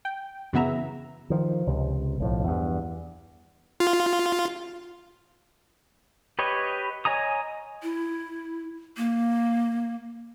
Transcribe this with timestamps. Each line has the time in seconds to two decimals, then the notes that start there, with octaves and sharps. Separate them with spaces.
0.05 G5
0.53 F#2 C#3 E3 B3 E5 A#5
1.30 D#3 F3
1.67 C#2 C3
2.20 B1 A2 F3
2.44 E2 G2
3.80 F4
6.39 G4 B4 C#5 D#5
7.05 C#5 D#5 G#5 A#5 D#6
7.83 E4
8.97 A#3